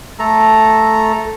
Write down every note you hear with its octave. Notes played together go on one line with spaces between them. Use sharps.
A3 A4 A#5